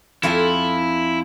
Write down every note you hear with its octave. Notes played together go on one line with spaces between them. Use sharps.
F2 E4 F4 G#5